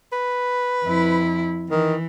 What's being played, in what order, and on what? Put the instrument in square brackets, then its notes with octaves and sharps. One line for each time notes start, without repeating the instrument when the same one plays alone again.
[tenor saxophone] B4
[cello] F2 E4
[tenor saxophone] D#3 [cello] E3